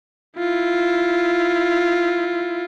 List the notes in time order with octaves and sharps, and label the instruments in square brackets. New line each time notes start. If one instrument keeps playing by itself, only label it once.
[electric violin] E4 F4